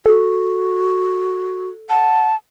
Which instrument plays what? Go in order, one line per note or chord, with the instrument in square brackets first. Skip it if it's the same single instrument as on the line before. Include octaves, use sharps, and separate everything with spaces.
[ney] F#4 [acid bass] A4
[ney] F#5 [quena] A5